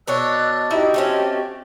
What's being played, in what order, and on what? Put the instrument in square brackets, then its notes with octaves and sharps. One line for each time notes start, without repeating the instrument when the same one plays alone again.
[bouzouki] B2 D4 C#5 [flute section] D#5 E6 F#6
[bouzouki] D#4 E4 E5 [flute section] F#4 G4 D#5
[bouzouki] A3 C4 C#4